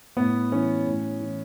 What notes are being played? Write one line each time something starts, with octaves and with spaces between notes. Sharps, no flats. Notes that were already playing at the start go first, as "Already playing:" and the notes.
A2 B3
E3 C#4
A2
E3